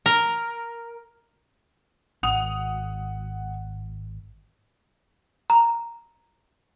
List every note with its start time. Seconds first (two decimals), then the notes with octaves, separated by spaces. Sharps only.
0.06 A#4
2.23 G#1 F#5 D#6 F7
5.50 A#5